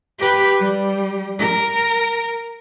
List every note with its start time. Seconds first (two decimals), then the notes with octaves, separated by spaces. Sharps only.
0.19 G4 B4
0.59 G3
1.39 A#4